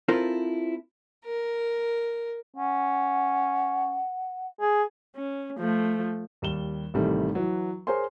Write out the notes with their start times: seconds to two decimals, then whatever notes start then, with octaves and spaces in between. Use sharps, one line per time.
0.08 C4 E4 F4 A4 A#4 C5
1.25 A#4
2.56 C#4 F#5
4.61 G#4
5.16 C#4
5.58 F3 A3
6.42 D#2 G3 E7 G7
6.94 A1 A2 C3 D#3 G3 A3
7.35 E3 F#3
7.87 G#4 A#4 C5 C#5 G#5 C6